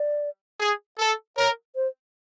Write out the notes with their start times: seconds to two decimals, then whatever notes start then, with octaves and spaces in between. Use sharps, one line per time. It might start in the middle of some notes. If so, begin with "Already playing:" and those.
Already playing: D5
0.60 G#4
0.99 A4
1.37 A#4 C#5
1.76 C5